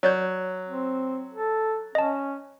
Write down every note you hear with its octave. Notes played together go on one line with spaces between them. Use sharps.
F#3 C#5 D5 G6
C4
A4
C#4 D#5 A5